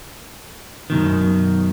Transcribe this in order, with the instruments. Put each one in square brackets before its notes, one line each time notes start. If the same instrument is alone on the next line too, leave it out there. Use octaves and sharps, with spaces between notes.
[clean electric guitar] F#2 B2 D#3